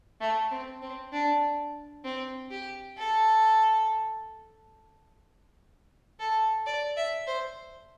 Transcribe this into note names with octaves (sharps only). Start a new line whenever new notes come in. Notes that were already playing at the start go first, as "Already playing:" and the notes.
A3
C4
C4
D4
C4
G4
A4
A4
D5
E5
C5